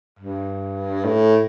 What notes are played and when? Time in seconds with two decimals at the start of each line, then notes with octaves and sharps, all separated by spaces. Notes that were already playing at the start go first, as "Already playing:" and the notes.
0.19 G2
1.04 A2